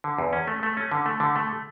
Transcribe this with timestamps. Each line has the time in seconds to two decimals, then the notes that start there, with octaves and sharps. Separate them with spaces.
0.04 D3
0.18 E2
0.33 C#4
0.48 A3
0.63 A3
0.77 C#4
0.92 D3
1.06 A3
1.20 D3
1.36 A3